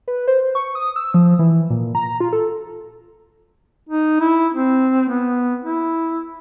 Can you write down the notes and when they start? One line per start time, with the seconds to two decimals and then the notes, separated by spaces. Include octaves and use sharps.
0.08 B4
0.28 C5
0.55 C#6
0.75 D#6
0.96 E6
1.14 F3
1.39 E3
1.70 A#2
1.95 A#5
2.20 F4
2.33 A4
3.89 D#4
4.20 E4
4.54 C4
5.08 B3
5.64 E4